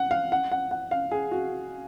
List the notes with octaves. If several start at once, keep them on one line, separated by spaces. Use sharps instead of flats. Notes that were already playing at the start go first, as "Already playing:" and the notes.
Already playing: F#5
F5
F#5
F#5
F#5
F5
G#4
F#4